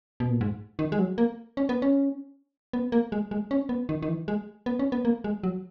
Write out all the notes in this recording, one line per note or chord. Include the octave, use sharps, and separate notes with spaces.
B2
A#2
G#2
D#3
G#3
F#3
A#3
C#4
B3
C#4
B3
A#3
G#3
G#3
C#4
B3
D#3
D#3
E3
G#3
B3
C#4
B3
A#3
G#3
F#3